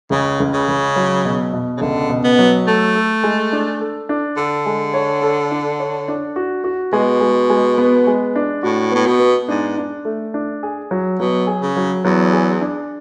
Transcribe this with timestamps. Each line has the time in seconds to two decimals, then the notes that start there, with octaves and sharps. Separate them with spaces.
0.10 C#2 C#3
0.40 C#2
0.53 C#3
0.68 C#2
0.96 F#3
1.25 B2
1.53 B2
1.77 C#3
1.81 C#2 D3
2.09 B2
2.24 B3
2.39 F#3
2.67 A3 A4
2.95 A4
3.24 G#3
3.52 D4
3.80 A4
4.09 D4
4.37 D3 A4
4.66 G#3
4.94 C#5
5.22 A4
5.51 D4
5.79 C#5
6.08 D4
6.36 F#4
6.64 F#4
6.93 B2 G#3
7.21 G#3
7.50 G#3
7.78 B3
8.07 G#3
8.36 D4
8.63 A2 F#4
8.91 A2 B3
9.06 B2
9.20 B3
9.49 G#2 D4
9.78 D4
10.05 A3
10.34 D4
10.63 G#4
10.91 F#3
11.19 B2 F#3
11.47 G#4
11.62 C#3
11.76 F#3
12.05 E2 F#3
12.33 G#4
12.61 D4